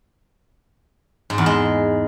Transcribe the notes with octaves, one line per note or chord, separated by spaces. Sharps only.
G#2
E2
G#3